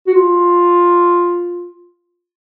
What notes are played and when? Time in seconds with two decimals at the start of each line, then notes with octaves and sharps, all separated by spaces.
0.07 F#4
0.14 F4